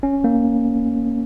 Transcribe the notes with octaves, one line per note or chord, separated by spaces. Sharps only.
C#4
A#3